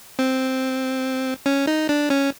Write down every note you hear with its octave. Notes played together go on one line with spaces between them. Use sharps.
C4
C#4
D#4
D4
C#4